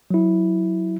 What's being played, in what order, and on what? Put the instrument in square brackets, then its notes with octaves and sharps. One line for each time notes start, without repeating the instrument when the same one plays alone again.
[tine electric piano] F#3 E4